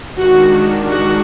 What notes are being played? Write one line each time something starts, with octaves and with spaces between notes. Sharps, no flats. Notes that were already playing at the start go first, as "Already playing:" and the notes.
D#3 G#3 D4 F#4
F#4